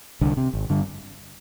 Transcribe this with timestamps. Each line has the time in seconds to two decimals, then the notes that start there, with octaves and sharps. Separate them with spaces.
0.21 C2 D3
0.37 C3
0.53 G#1
0.70 G2 D3